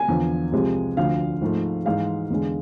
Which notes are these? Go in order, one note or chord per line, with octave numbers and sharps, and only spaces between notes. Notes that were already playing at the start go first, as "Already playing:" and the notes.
Already playing: G#5
E2 D3 F3
C2 C3 F3 G#3
D2 D3 F3 F5
G#2 F3 A3
G#2 E3 G#3 F5
E2 D3 G#3